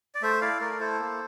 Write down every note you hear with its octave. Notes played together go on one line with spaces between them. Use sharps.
D5
A3 C5 E5
E4 D5 F5
A3 A#4 D5
E4 A4 C5
A#3